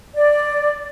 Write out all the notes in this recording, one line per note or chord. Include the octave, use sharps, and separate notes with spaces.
D5